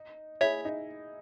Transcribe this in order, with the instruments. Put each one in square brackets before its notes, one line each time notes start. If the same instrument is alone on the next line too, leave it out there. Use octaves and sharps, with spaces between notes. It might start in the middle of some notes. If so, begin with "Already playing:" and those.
Already playing: [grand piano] D#4
[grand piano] E4 G#4 [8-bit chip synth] C#5 E5
[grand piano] D#4